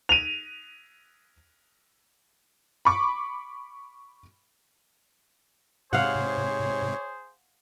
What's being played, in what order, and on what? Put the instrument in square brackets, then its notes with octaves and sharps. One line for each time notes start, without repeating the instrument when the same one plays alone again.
[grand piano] D#7 F7
[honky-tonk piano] B5 C#6 D6
[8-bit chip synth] G#2 C3 [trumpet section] G#4 C5 [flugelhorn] C#5 [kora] F5 F#5